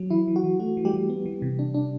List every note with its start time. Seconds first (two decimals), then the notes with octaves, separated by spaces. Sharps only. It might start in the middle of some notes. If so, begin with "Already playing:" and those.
Already playing: F#3
0.10 E3 E4
0.28 E3
0.36 F#4
0.44 E3
0.59 A3 F#4
0.77 E3
0.85 G3 G4
0.93 E3
1.09 B3
1.26 E3
1.42 C3
1.59 D4
1.74 D4